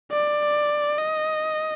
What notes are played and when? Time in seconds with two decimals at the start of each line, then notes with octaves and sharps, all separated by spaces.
0.11 D5
0.98 D#5